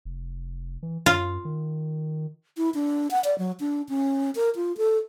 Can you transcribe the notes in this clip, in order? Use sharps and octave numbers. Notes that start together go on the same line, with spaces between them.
F1
E3
F#2 F4
D#3
E4
D4
F#5
D5
F#3
D4
C#4
A#4
F4
A4